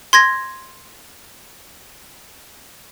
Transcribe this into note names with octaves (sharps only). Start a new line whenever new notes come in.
C6 G#6 A#6